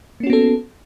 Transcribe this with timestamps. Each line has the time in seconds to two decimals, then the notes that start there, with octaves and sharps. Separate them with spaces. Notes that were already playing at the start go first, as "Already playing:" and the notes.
0.20 A#3
0.23 C#4
0.27 F#4
0.30 B3
0.33 A4